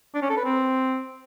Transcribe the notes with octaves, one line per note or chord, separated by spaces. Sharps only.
D4
C#4
A4
B4
C4